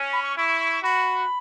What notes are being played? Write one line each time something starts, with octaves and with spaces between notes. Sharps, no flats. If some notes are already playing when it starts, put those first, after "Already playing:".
Already playing: C#4
B5
C#6
E4 C#6
C#6
C#6
C#6
F#4 B5